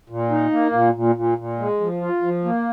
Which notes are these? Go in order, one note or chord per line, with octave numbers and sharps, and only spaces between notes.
A#2
D#4
A#3
A#2
A#2
A#2
A#2
G#3
F3
F4
F3
A#3